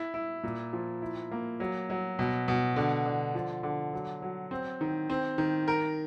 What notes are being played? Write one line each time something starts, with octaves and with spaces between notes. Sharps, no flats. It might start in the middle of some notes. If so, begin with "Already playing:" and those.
Already playing: E4
E4
A#2
F3
E4
A#3
F#3
F#3
B2
B2
D3
D3
F3
D3
F#3
F#3
C4
D#3
C4
D#3
A#4